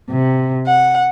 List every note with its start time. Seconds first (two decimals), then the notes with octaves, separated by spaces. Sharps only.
0.10 C3
0.67 F#5